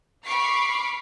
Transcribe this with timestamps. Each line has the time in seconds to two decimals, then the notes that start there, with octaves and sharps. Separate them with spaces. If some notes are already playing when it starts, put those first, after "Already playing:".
0.24 B5 C#6 D6 F6 C7